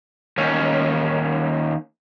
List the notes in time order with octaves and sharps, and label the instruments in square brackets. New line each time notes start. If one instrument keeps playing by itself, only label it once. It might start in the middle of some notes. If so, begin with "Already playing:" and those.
[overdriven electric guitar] D#2 C#4